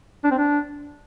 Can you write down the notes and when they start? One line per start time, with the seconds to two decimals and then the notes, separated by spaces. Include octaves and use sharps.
0.24 D4
0.31 C4
0.38 D4